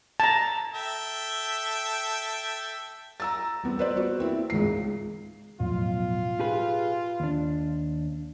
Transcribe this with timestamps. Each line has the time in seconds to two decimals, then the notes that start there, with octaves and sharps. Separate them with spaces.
0.20 A5 A#5
0.74 A4 E5 G5
3.20 A#5 E6 A6
3.64 G3 B3 C4
3.79 B4 C5 D5
3.96 B3 F#4
4.19 A#3 C4 E4
4.50 C#2 G#2 C7
5.60 B1 E2 A2 F3 F4
6.40 G4 G#4 B4
7.20 D#2 D4